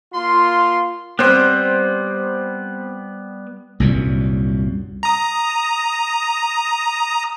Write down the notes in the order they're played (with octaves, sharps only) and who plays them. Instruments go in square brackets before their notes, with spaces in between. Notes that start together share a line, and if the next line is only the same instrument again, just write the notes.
[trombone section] A#3 F4 [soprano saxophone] C6
[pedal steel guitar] G3 B3 [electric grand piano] C4 C5 [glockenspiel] F#6
[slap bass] C2 F#2 A#2
[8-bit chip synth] A#5 D#6